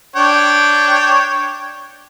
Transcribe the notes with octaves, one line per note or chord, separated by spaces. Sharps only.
D4 C#5 G5